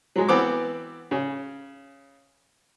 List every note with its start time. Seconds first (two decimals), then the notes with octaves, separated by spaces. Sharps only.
0.16 F#3 G#3
0.28 E3 B3 C4 D6
1.11 C#3